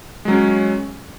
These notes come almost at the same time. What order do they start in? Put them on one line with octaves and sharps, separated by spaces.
G#3 F#3 C#4